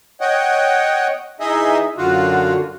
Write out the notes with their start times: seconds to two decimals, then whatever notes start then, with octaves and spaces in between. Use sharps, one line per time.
0.21 C#5 D#5 F#5 G5
1.40 E3 D#4 G#4 D#5 E5
1.98 F#2 D3 F4 F#4